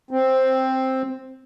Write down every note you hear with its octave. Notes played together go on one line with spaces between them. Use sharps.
C4